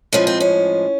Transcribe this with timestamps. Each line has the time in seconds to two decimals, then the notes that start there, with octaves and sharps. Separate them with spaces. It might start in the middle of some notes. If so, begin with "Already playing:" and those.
0.13 A2 F3 G#3 C#4
0.27 C4
0.40 C#4